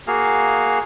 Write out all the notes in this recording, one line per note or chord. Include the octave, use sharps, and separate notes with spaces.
A#3 F#4 G#4 F5